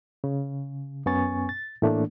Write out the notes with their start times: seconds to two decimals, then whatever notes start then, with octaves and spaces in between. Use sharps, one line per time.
0.24 C#3
1.06 F#2 B3 C#4 G#5 C#6 A6
1.49 A6
1.82 A2 E3 A3 A#3 D4